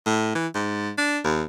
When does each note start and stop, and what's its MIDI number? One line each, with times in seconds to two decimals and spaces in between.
0.06 0.34 45
0.35 0.47 52
0.55 0.90 44
0.98 1.19 62
1.24 1.44 39